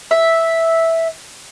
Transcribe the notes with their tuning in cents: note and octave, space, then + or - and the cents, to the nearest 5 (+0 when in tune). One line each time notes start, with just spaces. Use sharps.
E5 -5